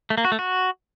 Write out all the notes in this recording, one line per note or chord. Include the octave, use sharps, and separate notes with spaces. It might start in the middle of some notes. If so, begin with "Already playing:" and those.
A3
A#3
F#4
A3
F#4